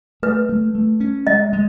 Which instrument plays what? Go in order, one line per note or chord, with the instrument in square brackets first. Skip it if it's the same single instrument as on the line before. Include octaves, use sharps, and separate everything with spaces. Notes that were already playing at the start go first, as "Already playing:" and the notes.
[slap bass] A3 [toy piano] B4
[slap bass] A3
A3
C#4
[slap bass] G#3 [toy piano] D#5
[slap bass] G#3